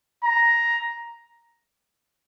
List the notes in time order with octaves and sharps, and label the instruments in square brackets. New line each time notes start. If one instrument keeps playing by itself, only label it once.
[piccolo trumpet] A#5